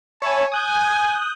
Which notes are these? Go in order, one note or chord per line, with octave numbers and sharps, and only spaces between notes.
C#5 E5 G#5 A5 B5
G#5 D#6 F#6 G6